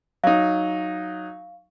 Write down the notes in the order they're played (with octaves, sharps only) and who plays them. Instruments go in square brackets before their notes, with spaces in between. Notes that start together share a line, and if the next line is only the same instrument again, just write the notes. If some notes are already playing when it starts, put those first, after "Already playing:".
[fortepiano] F#3 D#4 [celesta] F5